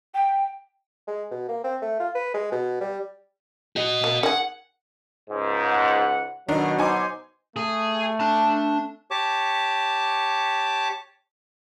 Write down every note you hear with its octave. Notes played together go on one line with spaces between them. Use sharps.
G5
G#3
B2
A#3
C4
A3
F4
B4
G#3
B2
G3
F#4 D#5
A#3
D#3 G#4 F#5
C#2 G#2
F#5
B2 D#3 F#3 D4 D#4
D#4 C5 G#5 D6
A3 G#4
D4 A5
G4 C#5 A5 D6